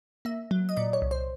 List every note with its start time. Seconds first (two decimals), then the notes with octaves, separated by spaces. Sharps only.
0.25 A#3 E5
0.51 F#3
0.69 D#5
0.77 A#2 D5
0.93 C#5
1.02 C2
1.11 C5